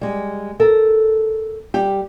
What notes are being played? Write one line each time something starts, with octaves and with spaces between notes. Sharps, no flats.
G3 G#3
A4 A#4
G3 G4